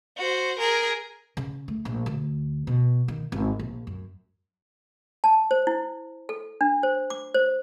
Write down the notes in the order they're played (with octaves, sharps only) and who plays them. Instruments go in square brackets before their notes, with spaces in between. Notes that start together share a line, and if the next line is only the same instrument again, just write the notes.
[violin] F#4 C5
G#4 A#4
[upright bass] C#3
A3
A#1
D2
B2
D#3
G#1
A#1
F#2
[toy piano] A5
C5
E4
A4
D4
C5
D6
C5